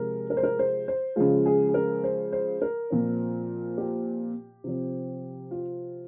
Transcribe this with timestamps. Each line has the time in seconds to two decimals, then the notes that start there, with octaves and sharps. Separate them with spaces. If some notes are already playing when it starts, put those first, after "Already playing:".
Already playing: C3 F3 G#3 A#4
0.30 A#4
0.37 C5
0.43 A#4
0.59 C5
0.88 C5
1.16 C#3 F3 G#3 F4
1.46 G#4
1.69 G#4
1.74 A#4
2.04 C5
2.33 C5
2.62 A#4
2.90 A#2 F3 C4
3.78 G4
4.64 C3 F3 C4
5.51 F4